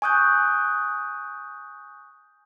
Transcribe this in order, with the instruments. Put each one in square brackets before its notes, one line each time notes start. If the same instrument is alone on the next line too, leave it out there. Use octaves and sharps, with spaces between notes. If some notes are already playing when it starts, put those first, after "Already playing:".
[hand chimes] G#5 C#6 D#6 F#6 G6